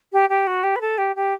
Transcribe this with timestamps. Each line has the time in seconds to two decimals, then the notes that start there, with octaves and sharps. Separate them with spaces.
0.13 G4
0.29 G4
0.47 F#4
0.63 G4
0.76 B4
0.81 A4
0.98 G4
1.16 G4